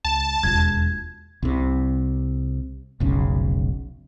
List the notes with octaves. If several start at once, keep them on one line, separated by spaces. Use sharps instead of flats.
C#2 A5
E1 D#2 F4 G#6
C2 C3
F1 B1 C#3